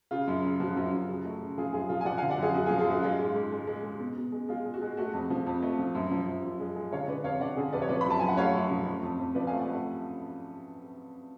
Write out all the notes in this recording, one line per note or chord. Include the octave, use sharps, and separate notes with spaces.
C#3 F4
F#2
C#3
F3 F#4
F#2
F#2
C#3 F#4
A3
C#3
F3 F4 G#4
F#2 F4 G#4
F3 F4 G#4
G#5
F3 D5 F#5
F5 G#5
D3
D5 F#5
F#2 F4 G#4
F#2 F#4
F4 G#4
F3
F4 G#4
F#2 F#4
G#3 F4
G#2
F4
G#2
G#3
G#3
G#3
B2
B2
G#3
G#3 F4
G#3
F#4
G#3
A3 F#4
F2
F3
F2
A3
F3
F#2
F3
F#2
F#2
G#3
G#3
D3 C#5 F5
D3 B4 D5
F2 C#5 F5
D3 D5 F#5
D3 F4 G#4
F2 B4 D5
C#5
F3 B4 D5
B5
F#2 A5
F#2 G#5
F#5
A3 C#5 F5
F#2
F3
A3
F2
F2
F3 B4 D5
F5 G#5
A3
D5 F#5
A3